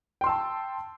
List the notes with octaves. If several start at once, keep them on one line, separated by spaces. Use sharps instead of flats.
G5 A5 C6 E6